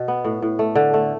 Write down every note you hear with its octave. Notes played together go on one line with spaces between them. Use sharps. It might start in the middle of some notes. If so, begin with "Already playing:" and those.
Already playing: B2
B3
A2
A2
A3
D3
A3